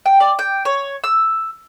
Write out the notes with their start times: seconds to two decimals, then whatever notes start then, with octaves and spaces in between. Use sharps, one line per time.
0.06 G5
0.20 D5
0.39 G5
0.65 C#5
1.04 E6